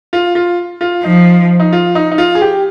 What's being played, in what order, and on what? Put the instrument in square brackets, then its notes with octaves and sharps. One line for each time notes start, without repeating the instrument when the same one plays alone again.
[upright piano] F4
F4
F4
[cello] F3 [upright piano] D#4
[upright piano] D#4
F4
D#4
D#4
F4
G#4
G4